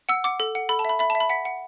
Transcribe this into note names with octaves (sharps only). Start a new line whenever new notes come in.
F#5 E6
F#5 D6
A4
F#5
A4 B5
A5
E5 B5
E5 B5
A5
E5
B5
F#5 B6
F#5